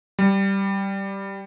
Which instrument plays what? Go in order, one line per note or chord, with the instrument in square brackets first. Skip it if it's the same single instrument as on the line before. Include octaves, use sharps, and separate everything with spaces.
[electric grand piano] G3